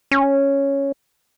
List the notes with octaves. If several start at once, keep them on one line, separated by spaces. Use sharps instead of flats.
C#4